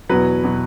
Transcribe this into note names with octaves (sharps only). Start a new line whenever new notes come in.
E2 B2 F#3 B4
B2 F#3